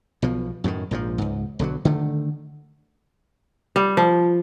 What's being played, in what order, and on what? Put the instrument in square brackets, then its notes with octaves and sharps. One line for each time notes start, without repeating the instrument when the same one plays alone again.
[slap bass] B1 B2 F3
F#2 A2 D3 D#3
A#1 G#2 E3 F3
C#2 G#2
B1 D3 D#3 F#3
D3 D#3 A3
[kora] G3
F3